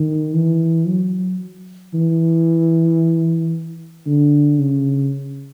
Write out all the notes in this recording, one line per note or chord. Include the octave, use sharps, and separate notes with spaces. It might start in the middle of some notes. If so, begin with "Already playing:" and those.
Already playing: D#3
E3
F#3
E3
D3
C#3